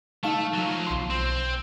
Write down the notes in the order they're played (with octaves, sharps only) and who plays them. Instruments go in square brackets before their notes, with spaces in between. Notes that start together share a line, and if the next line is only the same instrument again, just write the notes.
[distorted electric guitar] A3 [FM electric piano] D#4 F5 A5
[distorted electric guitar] F3 F#3
[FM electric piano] B1 C6
[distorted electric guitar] C4